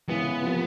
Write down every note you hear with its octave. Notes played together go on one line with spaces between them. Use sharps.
C#3 E3 G#3 B3
C3 F3 A#3